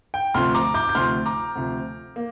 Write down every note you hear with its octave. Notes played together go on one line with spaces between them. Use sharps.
G5
D2 C3 F3 C6 F6
A#5 D6
D6 G6
G6
D2 C3 F3 C6 F6
A#5 D6
D2 C3 F3
A#3